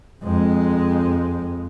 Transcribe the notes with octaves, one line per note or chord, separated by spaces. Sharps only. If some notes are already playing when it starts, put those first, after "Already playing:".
F2 G#3